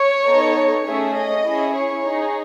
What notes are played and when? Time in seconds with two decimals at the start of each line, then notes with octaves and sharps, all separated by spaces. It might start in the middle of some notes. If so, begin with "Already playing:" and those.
Already playing: C#5
0.27 B3 D#4 A4
0.86 A3 C#4 G#4 E5
1.16 D#5
1.45 C#4 E4 G#4
1.74 C#5
2.05 D#4 G#4